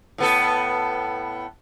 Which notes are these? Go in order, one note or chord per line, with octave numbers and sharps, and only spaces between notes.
A2 B3 A4